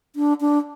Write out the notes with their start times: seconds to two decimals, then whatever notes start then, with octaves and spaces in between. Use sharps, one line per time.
0.16 D4
0.41 D4